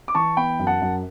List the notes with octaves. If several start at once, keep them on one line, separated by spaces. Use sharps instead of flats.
D6
E3 A5 C#6
B3 G5 B5
F#2
F#5 A5
F#2